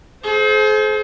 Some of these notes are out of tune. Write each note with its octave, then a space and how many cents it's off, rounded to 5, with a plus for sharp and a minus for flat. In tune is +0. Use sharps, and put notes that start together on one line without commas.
G#4 +45 C5 +0